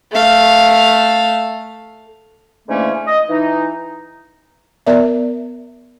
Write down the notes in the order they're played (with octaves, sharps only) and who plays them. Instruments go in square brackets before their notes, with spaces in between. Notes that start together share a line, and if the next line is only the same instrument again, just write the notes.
[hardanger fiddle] A3 F5
[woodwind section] G#2 D3 E3 A3 A#3 C#4
D#5
E3 D#4
[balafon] B3 A#4 D5 E5